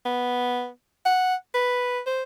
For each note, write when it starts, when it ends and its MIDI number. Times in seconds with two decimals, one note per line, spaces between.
0.05 0.68 59
1.05 1.35 78
1.54 1.99 71
2.06 2.23 72